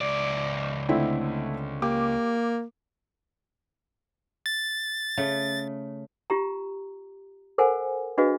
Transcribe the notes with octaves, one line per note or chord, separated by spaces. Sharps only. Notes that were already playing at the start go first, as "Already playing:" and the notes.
C#2 D5
D3 A3 C4 E4
A#3 G4 D6
A6
C#3 A3
F4 G4 A#5
A4 A#4 C5 F#5 G#5
D4 F#4 G#4 B4 D#5 F5